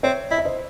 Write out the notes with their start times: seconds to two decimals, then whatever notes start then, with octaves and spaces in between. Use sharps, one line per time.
0.03 C4 C#5 E5
0.31 E4 D#5
0.38 E5
0.45 C5 D#5